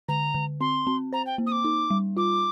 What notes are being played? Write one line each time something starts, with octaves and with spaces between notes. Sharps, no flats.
D3 A#5
D3
C4 C6
C4
C5 A#5
G5
A#3
D#6
D6
D#4
G3
F4 D6